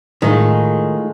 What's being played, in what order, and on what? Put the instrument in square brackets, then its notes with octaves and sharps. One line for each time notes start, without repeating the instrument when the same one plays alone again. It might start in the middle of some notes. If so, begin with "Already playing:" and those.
[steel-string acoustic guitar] A2 G#3 F4 [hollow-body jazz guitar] D#3